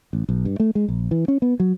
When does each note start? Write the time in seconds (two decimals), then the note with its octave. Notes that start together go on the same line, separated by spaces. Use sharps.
0.13 A1
0.29 B1
0.45 G2
0.60 A3
0.75 G#3
0.88 A#1
1.11 E3
1.28 C#4
1.42 B3
1.60 F#3